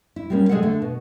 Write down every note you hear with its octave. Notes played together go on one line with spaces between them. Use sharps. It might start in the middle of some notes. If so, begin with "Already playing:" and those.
E4
G3 G#3 A#3 C4 C#4
C3 G#3 G#4 A4 C5 F#5
D3 A3
B2